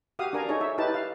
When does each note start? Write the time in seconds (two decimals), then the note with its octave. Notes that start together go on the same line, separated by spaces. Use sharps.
0.19 F#4 G4 F5 D#6
0.33 D4 A#4 G#5 A#5
0.49 D#4 G#4 A4 C#5
0.61 E5
0.78 D#4 E4 G4 B4 A5
0.94 F5